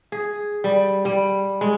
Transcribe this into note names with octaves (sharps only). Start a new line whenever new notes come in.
G#4
G3
G3
G#3